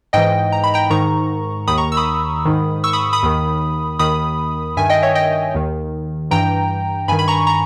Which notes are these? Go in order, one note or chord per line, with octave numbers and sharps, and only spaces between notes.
G#2 E3 D#5 G5
A#5
B5
G5 A#5
G#2 D#3 A#5 C#6
D#2 D#3 B5 D#6
A#5 C#6
E6
B5 D#6
G#2 D#3
C#6 E6
B5 D#6
B5 D#6
D#2 D#3
D#2 D#3 B5 D#6
G2 D#3 E5 G#5
D#5 G5
C#5 E5
D#5 G5
D#2 D#3
G2 E3 G5 A#5
G2 D#3 G#5 B5
B5
A#5 C#6
A#5 C#6